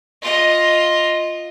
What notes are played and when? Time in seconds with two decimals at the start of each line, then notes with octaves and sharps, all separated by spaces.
0.22 F4 D#5